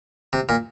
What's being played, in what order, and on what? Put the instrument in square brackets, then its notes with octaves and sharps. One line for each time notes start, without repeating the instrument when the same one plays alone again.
[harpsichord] C3
A#2